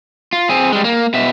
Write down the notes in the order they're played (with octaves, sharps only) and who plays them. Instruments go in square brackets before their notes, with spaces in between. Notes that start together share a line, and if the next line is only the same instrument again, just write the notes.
[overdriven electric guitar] F4
C4 G#4
G3 G#3
A#3
B2 E5